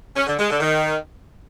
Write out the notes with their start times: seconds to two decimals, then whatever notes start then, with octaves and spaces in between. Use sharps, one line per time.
0.16 C#4
0.27 D3
0.38 G#3
0.49 D3
0.60 D#3